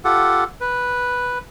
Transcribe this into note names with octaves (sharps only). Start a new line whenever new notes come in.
F4 G4 A4 F#5
B4